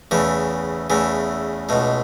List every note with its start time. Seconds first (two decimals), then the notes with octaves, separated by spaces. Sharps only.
0.11 E2 C#3 E3 A3
0.90 E2 C#3 E3 A3
1.69 C#2 B2 A3